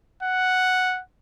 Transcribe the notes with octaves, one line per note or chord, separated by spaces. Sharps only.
F#5